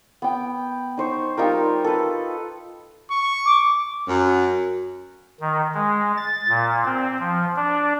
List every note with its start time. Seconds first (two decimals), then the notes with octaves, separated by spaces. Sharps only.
0.22 B3 G5
0.97 D#4 C5 C#6
1.37 G3 D#4 F4 A#4
1.85 A4 B4
3.11 C#6
3.45 D6
4.08 F#2
5.40 D#3
5.74 G#3
6.17 A6
6.48 A#2
6.85 C4
7.19 F3
7.56 D4